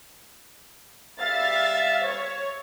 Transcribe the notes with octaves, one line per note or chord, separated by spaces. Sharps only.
G3 E5 F5 A6
C#5